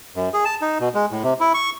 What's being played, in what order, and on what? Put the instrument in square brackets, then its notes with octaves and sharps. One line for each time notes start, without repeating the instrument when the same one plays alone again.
[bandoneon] F#2
G#4
A5
D#4
B2
G#3
A2
C3
E4
C#6